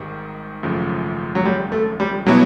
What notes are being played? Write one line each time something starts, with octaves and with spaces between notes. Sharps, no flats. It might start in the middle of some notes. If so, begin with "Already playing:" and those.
Already playing: G#1 G#2 D#3 G3
G#1 F#2 C#3 F3 A3
F#3
G3
A3
G3
B2 F#3 G3 B3 E4